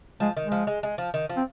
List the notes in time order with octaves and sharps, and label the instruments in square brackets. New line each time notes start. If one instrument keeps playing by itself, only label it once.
[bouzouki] F3 [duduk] G#3
[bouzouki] D#3
[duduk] G#3
[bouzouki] F3
G#3
G#3
F3
D#3
F3
[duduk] C4